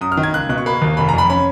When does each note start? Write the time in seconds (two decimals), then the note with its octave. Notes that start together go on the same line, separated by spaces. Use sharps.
0.01 F#2 D#6
0.12 F6
0.17 D#3
0.23 G#6
0.34 C#2 F#6
0.49 B2 F#6
0.58 C#6
0.66 A#3 B5
0.82 D#2
0.97 F1 B5
1.09 A#5
1.13 F2 B5
1.30 C#4 B5